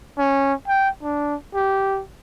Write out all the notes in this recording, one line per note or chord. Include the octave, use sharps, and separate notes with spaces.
C#4
G5
D4
G4